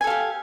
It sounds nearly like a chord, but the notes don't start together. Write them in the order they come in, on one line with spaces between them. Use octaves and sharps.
G#5 A4 F5 G4